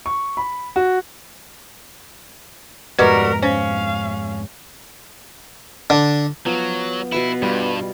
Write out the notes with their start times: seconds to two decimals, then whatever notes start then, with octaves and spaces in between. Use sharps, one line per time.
0.06 C#6
0.37 B5
0.76 F#4
2.99 F2 G#2 B2 G3 F#4 A#4 B4 D#5
3.43 C#4 C5 F5
5.90 D3
6.46 F3 F#3 B3
7.12 B2 E4 B4 C#6
7.42 G2 G3 F4